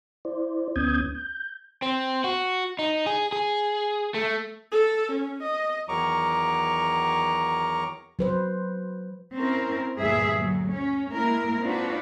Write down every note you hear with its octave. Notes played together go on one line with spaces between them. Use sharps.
E4 C5 D5
D2 B3 C#4 D#6 G6 G#6
G6
C4
F#4
D#4
G#4
G#4
A3
A4
C#4
D#5
E2 D#3 F#3 A#5 C#6 D6
F#3 B4 C5
C4 C#4 E4 A#4
D2 G2 A#2 E3 G#4 E5
D2 F#3
C#4
G#3 A#3 E4 A#4
C4 D4 D#4 F4 F#4 B4